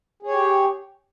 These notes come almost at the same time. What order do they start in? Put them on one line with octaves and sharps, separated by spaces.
G#4 C#5 G4